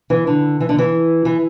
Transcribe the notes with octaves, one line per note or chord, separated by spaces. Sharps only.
E3
D3
E3
D3
E3
E3